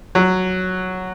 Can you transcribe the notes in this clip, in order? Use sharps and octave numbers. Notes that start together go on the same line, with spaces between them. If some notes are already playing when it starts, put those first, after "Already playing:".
F#3